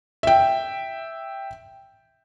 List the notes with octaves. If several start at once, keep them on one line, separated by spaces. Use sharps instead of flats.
E5 G5